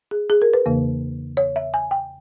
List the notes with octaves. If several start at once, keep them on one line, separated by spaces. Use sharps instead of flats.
G#4
G#4
A#4
B4
E2 C#3 E3 A#3
C#5
E5
G#5
G5